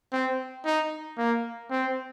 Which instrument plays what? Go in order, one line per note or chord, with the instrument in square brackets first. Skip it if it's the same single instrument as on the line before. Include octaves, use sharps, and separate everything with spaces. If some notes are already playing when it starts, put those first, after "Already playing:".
[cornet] C4
D#4
A#3
C4